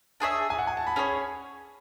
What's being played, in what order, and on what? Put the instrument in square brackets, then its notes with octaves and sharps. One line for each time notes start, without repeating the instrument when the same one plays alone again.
[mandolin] D4 G#4 C#5 E5
[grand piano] G#5
F#5
G#5
A5
B5
[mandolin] C#4 G#4 C#5